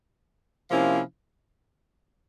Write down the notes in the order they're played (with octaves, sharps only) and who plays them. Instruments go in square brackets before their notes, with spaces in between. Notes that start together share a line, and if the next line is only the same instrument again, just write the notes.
[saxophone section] C3 F3 A#3 C#4 E4